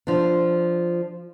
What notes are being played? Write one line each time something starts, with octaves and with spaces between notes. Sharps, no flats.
F3 D4